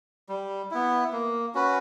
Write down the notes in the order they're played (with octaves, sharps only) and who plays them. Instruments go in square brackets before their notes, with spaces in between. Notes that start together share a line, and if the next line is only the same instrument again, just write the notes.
[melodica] G3
B3 E4
A#3
C#4 F#4 B4